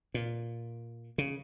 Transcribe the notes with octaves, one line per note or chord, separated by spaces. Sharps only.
A#2
C#3